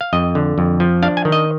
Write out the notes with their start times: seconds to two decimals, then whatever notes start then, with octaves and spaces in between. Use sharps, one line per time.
0.01 F5
0.13 F2 D#5
0.35 D3
0.58 F2
0.80 F3
1.02 D4 F5
1.17 G#5
1.25 D#3
1.32 D#5